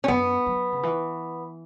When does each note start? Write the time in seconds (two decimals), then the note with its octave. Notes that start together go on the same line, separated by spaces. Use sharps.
0.04 C#4
0.08 F#2 B3
0.47 F#3
0.72 C#3
0.83 E3